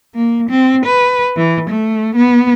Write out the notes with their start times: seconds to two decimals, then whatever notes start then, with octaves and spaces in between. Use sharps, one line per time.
0.15 A#3
0.50 C4
0.86 B4
1.37 E3
1.70 A3
2.16 B3